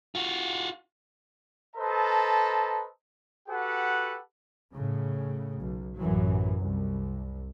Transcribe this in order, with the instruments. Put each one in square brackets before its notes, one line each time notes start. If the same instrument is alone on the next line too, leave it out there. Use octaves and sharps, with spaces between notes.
[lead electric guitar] F4 F#4
[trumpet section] A4 B4 C5 D#5 A5 A#5
F#4 G4 A4 B4 F#5
[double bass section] A2 C#3
B1
A1 F#2 E3 F#3
C2